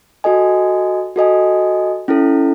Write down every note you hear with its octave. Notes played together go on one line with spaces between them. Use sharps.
F#4 A4 D#5 G#5
F#4 A4 D#5 G#5
C#4 E4 A4